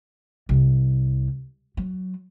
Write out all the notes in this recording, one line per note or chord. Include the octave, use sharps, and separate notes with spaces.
C2
F#3